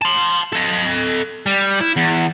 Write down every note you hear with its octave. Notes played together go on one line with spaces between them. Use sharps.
A5 C6
A4 D#5
G3
E4
E2